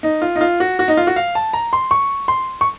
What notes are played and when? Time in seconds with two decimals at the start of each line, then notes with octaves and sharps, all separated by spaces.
0.03 D#4
0.22 F4
0.36 D#4
0.41 F4
0.60 F#4
0.79 F#4
0.88 D#4
0.97 F4
1.07 F#4
1.16 F5
1.35 A5
1.53 A#5
1.73 C6
1.91 C#6
2.28 C6
2.61 C#6